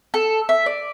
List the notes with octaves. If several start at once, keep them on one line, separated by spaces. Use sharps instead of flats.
A4
E5
D5